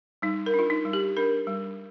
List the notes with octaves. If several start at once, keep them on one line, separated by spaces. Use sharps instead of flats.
G3 D#4
A#4
D4
F4
D#4
G3
G4
D4 A#4
G3